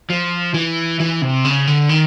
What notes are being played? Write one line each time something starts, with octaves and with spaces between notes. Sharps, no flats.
F3
E3
E3
C3
C#3
D3
D#3